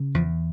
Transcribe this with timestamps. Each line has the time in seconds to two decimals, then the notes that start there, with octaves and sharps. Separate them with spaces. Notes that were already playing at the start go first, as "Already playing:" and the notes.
Already playing: C#3
0.14 E2 F3